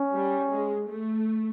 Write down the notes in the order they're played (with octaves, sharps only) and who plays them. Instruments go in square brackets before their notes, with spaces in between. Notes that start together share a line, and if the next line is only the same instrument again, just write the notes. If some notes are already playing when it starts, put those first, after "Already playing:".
Already playing: [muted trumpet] C#4
[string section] G3
G#3
A3